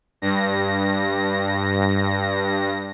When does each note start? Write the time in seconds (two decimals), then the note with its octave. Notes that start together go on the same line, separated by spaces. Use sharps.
0.22 G2 A#6